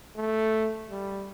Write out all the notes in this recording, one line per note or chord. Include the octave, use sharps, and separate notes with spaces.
A3
G3